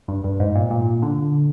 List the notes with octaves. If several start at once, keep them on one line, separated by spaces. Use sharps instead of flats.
G2
G2
G#2
A#2
A#2
D3